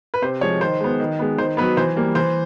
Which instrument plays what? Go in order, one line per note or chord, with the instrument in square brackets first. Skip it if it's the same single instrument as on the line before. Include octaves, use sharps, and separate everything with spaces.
[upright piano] B4
C3 C5
F3 G#3 C#5
D#3 C5
G#3 B3
D#3
G#3 B3
D#3 C5
B3 B4
F#3
E3 C5
G3 A#3
E3 C5